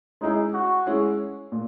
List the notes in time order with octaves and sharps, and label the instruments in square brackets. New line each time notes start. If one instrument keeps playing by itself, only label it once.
[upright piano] G#3 C#4 E4 G#4 [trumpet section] D#4
[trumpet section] F#4
[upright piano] G#3 C#4 E4 G#4
A#2